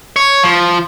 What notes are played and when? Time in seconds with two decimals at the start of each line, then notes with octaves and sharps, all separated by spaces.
0.16 C#5
0.43 F3